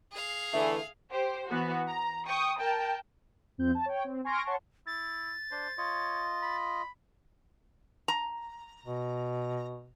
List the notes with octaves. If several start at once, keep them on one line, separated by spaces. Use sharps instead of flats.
G#4 F5
D3 E3 A3 E5
G4 C5
E3 B3 F#4
A#5
G5 C#6 D#6
A#4 G5 A5
F2 C4 G6
A5
C#5 G5
C4
G#5 C6 C#6 F6 A#6 D7
C#5 F#5 A5 C6 C#6
E4 A6
D4 C5
F4 C#5 D#5
B5
A#5
B2